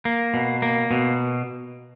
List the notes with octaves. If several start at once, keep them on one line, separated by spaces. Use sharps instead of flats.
A#3
B2
A#3
B2